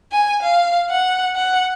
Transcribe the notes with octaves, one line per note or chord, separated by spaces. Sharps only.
G#5
F5
F#5
F#5